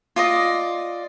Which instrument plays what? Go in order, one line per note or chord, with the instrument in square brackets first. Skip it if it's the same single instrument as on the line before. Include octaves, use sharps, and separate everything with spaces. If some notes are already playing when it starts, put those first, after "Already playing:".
[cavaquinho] F4 D5 D#5